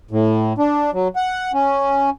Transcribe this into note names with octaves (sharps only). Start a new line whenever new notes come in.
A2
D4
F#3
F#5
C#4